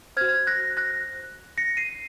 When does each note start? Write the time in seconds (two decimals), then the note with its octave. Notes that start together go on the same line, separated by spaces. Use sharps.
0.17 F#4 C5 F6 G#6
0.47 F#6 A#6
0.77 F#6 A#6
1.58 A#6 C#7
1.77 C7 D#7